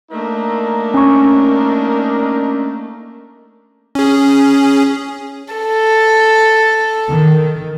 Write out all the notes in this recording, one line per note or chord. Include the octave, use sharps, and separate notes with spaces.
A3 A#3 D4 D#4 A#4
C#4 C#6
C#4 G#4
A4
D#3